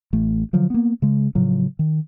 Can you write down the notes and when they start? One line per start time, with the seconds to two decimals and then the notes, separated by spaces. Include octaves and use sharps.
0.13 A1 A3
0.53 D3 F3 F#3
0.70 A#3 B3
1.02 C#3 G#3
1.35 A2 C#3 F3 F#3
1.79 D#3